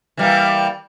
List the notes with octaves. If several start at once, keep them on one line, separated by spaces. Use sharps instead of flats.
E3 G3 A#3